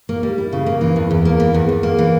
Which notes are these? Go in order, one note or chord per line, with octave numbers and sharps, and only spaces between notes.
A#3
G3
E4
C#3
A#3
E3
E2
E2
A#3
E3
E2
E2
A#3
E3